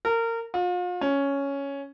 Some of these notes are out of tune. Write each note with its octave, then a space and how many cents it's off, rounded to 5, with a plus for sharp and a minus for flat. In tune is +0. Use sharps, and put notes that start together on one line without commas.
A#4 -25
F4 +40
C#4 +5